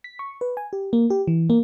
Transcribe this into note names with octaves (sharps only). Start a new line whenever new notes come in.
B6
C#6
B4
G#5
G4
A#3
G4
E3
A#3